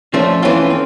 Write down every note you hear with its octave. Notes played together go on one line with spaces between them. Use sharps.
F3 A3 C#4 D4
E3 A3 C4 C#4 F4
C4